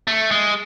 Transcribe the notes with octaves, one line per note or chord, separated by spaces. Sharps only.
A3
G#3